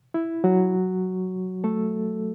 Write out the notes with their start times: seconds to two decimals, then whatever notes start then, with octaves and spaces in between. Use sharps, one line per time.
0.14 E4
0.44 F#3 F#4
1.64 A3 A4